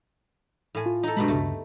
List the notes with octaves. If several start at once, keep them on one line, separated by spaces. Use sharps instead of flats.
A2 G#5
F4
D#4 A4
G2 B2 G#3 B5
D2 G2 C#3 A3